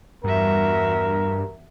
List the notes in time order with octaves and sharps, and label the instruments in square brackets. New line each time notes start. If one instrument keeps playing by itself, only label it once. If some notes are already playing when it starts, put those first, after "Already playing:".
[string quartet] E2 F#4 E5 [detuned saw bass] G2 [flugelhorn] A#4